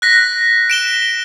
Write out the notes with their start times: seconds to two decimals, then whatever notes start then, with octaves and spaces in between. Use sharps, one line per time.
0.02 F#6 A#6 B6
0.70 D7 E7 G7